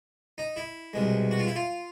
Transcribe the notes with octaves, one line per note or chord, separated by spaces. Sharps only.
D#4
E4
C2 B2 G#3
F#4
F4
E4
F4